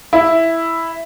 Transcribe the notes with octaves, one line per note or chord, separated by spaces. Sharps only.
E4